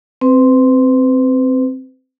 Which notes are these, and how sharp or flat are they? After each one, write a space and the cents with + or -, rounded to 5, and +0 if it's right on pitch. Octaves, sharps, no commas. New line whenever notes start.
C4 +0 B4 +35